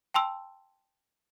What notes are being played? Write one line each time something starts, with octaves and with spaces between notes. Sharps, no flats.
G5 A5 C6 E6